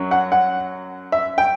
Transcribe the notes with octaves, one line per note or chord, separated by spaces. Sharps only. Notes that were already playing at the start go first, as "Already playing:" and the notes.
Already playing: F#2 F#3
F#5
F#5
E5
G5